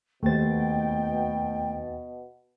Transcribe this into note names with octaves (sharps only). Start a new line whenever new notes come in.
D#2 B2 A3 C5 G5 A6